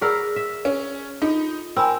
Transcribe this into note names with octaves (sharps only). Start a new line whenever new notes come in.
G#4 A#4 B4 D5 F#5 E6
E5
C#4
D#4 F4 A4
C4 A#4 G#5 B5 E6